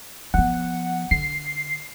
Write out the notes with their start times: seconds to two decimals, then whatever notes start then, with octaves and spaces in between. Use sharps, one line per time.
0.34 F3 B3 F#5
1.11 D3 C7